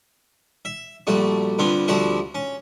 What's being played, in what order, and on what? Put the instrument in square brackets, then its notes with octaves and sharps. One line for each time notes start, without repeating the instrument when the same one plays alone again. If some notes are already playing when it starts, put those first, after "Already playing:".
[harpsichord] E5
A#1 G3 A3 F#4
G2 D3 B3 C4 F4
D2 F3 G3 C4 F#4 E5
C#4